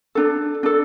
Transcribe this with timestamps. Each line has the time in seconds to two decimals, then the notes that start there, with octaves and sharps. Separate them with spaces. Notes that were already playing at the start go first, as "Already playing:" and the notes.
0.15 D4 A4
0.63 D4 A4